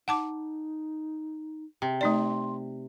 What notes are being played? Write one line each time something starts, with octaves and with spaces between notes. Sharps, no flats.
D#4 F#5 A5 D6
C3
A3 D#4 D5 C6